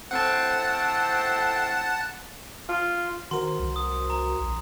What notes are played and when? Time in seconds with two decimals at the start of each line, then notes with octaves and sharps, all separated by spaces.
0.11 A2 C4 F#5 A5
2.69 F4
3.31 D#3 F#4 A#4 C5 C6
3.59 C2
3.76 D#6
4.10 A#5
4.41 A#1